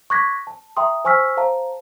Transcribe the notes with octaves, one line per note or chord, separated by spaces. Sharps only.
C#6 D6 F#6 G#6 A#6 B6
A5
E5 G5 A#5 C6 D#6
C5 G#5 C#6 E6 F6 B6
C5 F5 A5 A#5